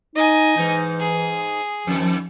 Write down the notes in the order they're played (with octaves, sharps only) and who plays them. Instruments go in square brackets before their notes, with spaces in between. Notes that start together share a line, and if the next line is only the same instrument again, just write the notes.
[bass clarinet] D#4 [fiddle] D#5 G#5
[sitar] G#2 D#4 [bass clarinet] E3
[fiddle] G#4
[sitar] F2 D#3 [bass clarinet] F3